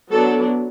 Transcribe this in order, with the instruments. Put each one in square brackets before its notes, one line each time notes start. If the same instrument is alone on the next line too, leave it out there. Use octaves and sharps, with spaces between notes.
[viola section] F#3 B3 D4 A4